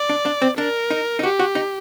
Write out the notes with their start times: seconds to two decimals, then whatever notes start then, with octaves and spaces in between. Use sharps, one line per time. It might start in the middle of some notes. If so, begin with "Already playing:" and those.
Already playing: D5
0.10 D4
0.26 D4
0.42 C4
0.58 D4 A#4
0.91 D#4
1.19 D#4
1.23 F#4 G4
1.39 F#4
1.55 D#4